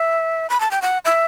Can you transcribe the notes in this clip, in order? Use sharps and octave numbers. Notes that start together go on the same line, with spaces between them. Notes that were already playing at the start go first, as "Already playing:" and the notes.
Already playing: E5
B5
A5
G5
F#5
E5